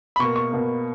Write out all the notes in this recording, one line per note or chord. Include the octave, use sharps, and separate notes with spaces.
B5
B2 A#3 C#6
C#6
B2 A#3